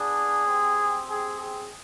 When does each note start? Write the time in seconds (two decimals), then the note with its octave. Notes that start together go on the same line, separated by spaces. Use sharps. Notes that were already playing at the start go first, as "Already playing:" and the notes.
Already playing: B3 D4 G#4
0.47 C4 G4
1.08 G#4
1.39 G#4